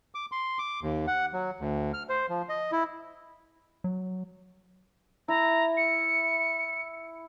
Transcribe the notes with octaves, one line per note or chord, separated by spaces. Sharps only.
D6
C6
D6
D#2
F#5
F#3
D2
F6
C5
F3
D#5
E4
F#3
E4 A#5
C#7